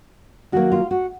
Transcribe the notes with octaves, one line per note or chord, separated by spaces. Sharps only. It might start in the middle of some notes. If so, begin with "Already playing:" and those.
D#3 F#3 A#3 F#4
F4
F#4